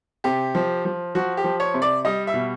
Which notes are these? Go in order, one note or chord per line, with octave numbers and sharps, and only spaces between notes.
C3 G4
F3
F3
F3 F#4
G4
F3
C#5
C3
D5
G3 D#5
E5
B2